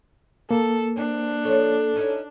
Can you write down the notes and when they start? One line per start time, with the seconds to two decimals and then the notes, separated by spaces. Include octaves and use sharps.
0.51 A#3 A4
0.97 C4 D4
1.45 F3 A4 C#5
1.96 C#4 D#4 E4